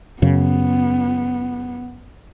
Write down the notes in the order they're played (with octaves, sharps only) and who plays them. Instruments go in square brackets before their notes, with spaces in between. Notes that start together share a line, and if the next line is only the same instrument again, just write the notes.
[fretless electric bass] F#2 C#3 [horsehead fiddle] B3